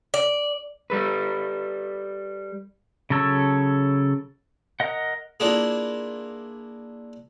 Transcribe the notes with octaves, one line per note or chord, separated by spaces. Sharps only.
D5
G3 A4 B4
C#3 F#3 A4 C#5 E6
A#4 D#5 F#5
A#3 D4 E4 F4 G#4